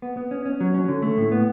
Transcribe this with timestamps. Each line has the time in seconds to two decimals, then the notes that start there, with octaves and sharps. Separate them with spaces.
0.02 B3
0.17 B3
0.31 C#4
0.46 C#4
0.61 F#3
0.74 C#4
0.88 D3
1.02 A3
1.18 A2
1.32 B3